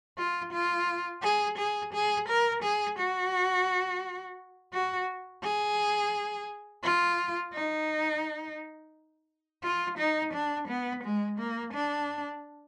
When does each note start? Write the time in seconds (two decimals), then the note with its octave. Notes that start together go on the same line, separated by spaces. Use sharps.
0.18 F4
0.53 F4
1.23 G#4
1.58 G#4
1.94 G#4
2.28 A#4
2.63 G#4
2.99 F#4
4.73 F#4
5.44 G#4
6.84 F4
7.54 D#4
9.64 F4
9.98 D#4
10.33 D4
10.68 B3
11.04 G#3
11.39 A#3
11.73 D4